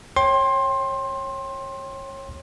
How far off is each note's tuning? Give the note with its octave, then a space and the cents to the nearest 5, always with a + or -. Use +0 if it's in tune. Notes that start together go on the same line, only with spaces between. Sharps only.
C#5 -25 G5 +0 C6 +20